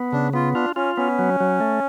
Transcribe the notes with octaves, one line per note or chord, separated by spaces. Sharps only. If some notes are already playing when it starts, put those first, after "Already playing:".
Already playing: B3
C#3 D4
B3 F4
D4 F4
C#4 F4
B3 C#4
F#3
F#3
A3